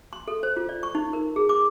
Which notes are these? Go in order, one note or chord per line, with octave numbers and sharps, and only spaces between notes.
C6
A4
C5
F4
D5
C#6
D#4
A#4
G#4
D6